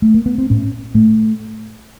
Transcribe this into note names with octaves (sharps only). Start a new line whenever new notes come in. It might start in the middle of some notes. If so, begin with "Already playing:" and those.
A3
A#3
B3
C4
A2 C#4
A2 A3